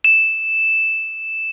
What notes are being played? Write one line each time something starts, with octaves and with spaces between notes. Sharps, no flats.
E7